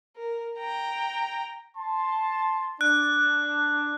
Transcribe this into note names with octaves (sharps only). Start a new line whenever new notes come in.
A#4
G5 A#5
A5 C6
D4 F#6